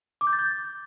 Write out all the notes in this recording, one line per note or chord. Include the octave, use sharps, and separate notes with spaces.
D6
G6
A6
G6